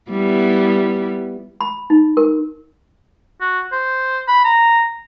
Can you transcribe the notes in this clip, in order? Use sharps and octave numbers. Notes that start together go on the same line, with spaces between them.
G3 B3 E4
B5
D#4
A#4
F#4
C5
B5
A#5